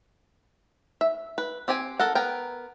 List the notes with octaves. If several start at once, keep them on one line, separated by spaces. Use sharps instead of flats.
E5
B4
C4 G4 G5 G#5
A4 A#4 F#5
B3 A#4 G5